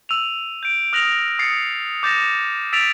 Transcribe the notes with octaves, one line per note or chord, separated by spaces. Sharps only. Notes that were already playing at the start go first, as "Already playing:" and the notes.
E6 D#7 F7
G6 D7
D#6 F6 F#6 A#6 F7 F#7
D#6 A6 C7 C#7
D6 G6 A6 A#6 E7
E6 A6 B6 D7 E7 F7